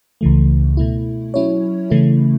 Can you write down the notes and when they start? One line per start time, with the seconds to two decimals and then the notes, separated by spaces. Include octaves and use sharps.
0.21 C#2 C#3 E3 A3
0.77 B2 A3 E4
1.34 F#3 C#4 E4 C#5
1.90 C#3 E3 A3 E4